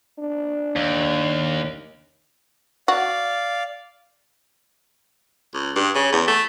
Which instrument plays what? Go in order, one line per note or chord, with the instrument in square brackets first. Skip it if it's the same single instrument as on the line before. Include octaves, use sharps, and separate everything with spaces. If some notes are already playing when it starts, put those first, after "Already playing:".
[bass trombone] D4
[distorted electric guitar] D#2
[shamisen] F#4 [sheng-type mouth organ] D5 F5
[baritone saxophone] C#2
G2
C#3
E2
A3